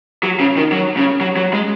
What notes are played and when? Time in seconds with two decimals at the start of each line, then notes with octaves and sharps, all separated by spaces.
0.23 F#3
0.40 C#3
0.57 D#3
0.72 F#3
0.97 C#3
1.21 F#3
1.37 F#3
1.53 G#3